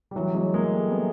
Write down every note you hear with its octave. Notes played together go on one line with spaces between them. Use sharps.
G3
E3 F#3
F#3 G#3
G#3 A#3
G3 A3
A3 B3